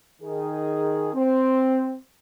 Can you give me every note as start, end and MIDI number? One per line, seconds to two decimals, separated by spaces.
0.22 1.09 51
0.22 1.09 68
1.13 1.94 60